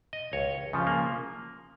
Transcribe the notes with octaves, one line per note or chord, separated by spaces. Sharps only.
D#5
C#2 C#5
C#3 F3
A#3